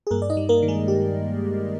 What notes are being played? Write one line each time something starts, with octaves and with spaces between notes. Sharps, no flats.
G#4
G2 A#3 A#4
D5
D#4 D#5
G3
A#3 A#4
D#3
G#3 G#4
G4